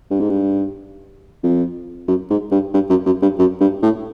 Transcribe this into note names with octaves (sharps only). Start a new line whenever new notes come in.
G2
G#2
G2
F2
F#2
G#2
G2
G2
F#2
F#2
G2
F#2
G2
A2